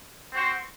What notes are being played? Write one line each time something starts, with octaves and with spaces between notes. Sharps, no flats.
C4 F#4 C5